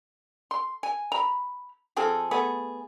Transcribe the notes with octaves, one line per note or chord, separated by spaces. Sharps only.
C6
G#5
A#5 B5
F3 C4 G#4 A4
A3 B3 G#4